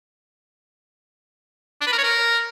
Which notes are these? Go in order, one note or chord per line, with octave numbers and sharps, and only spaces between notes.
D4
B4
A#4
C#5
A#4